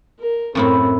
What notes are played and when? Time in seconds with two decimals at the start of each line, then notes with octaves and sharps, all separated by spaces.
0.19 A#4
0.55 F#2 A2 C4 E4